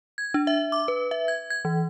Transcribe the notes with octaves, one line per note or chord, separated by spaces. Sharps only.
G#6
D4
E5
D6
B4
E5
G#6
G#6
E3